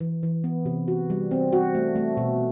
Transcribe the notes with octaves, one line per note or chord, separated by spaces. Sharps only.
E3
E3
B3
C3
F#4
G3
C4
F#4
A3
A3
B2